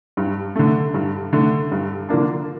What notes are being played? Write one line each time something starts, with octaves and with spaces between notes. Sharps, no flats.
G2
D3 A3
G2
D3 A3
G2
D3 F3 A#3 D4